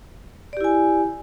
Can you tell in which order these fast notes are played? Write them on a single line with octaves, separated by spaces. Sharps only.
D5 G4 E4 G#5